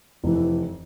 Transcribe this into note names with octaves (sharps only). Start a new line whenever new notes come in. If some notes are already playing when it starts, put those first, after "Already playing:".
F1 E3